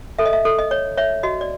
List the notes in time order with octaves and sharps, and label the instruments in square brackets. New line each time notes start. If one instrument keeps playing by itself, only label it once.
[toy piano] A4 E5
D#5
E5
A4
D#5
C#5
C#5 E5
F#4 D#5
D5